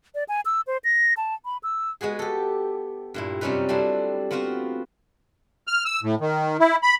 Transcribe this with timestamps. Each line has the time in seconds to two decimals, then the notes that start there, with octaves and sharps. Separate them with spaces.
0.15 D5
0.29 G#5
0.45 E6
0.67 C5
0.84 A#6
1.17 A5
1.45 B5
1.63 E6
2.01 G#3 B3 F#4 G#4
2.19 G4 A4
3.14 G2 A#2 E4
3.41 F#2 C3 G3 C#4 D#4 B4
3.69 G3 A3 C4 D4 E4
4.31 B3 C4 F4 F#4 B4
5.67 F6
5.85 E6
6.03 A2
6.21 D#3
6.60 E4
6.83 B5